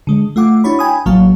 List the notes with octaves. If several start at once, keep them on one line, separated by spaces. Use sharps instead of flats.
D3 G#3
A3 F4 F#5 D6
D4 E4 F#4 C#5 B5
G5 G#5 B5 D#6
A1 F#3 A#3 F#4 F5 A5